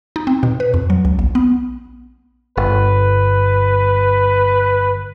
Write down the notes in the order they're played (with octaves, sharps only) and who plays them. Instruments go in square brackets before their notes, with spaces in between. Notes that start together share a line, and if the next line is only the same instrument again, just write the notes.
[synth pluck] D#4
C4
B2
B4
F2
F#3
C#2
A#1
B3
[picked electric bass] G1 [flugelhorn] B4